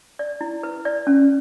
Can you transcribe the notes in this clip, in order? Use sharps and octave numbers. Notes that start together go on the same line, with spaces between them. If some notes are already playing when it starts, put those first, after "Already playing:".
D5
E4
B4
D5
C#4